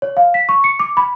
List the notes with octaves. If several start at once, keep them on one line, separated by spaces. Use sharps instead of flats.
C#5
F5
B6
C#6
C#7
D6
B5